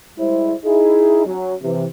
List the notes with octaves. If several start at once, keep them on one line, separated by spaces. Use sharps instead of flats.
G3 G#3 E4 C5
D#4 E4 G#4
F#3 C#4
C3 E3